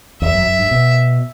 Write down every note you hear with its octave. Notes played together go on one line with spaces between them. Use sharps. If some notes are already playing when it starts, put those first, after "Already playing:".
E2 E5
F#2
F#2
G2
B2